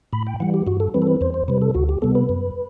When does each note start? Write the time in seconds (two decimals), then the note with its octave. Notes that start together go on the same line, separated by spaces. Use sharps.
0.13 A2 B5
0.27 G5
0.40 E3 G3 F#5
0.54 G4
0.67 G2 F#4
0.80 A4
0.94 E3 G3 C4 B4
1.02 A4
1.07 B4
1.21 E2 C5
1.34 C5
1.48 C3 G3 B4
1.62 A4
1.74 D2 F#4
1.89 G4
2.02 C3 G3 B3 A4
2.15 B4
2.29 F#2